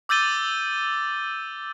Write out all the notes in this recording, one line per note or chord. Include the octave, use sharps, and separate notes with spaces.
D6 E6 G6 A6 D#7 G7